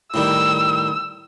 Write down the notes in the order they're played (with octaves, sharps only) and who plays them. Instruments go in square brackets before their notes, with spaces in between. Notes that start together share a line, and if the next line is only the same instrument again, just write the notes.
[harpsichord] A2 D#3 G3 [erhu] E6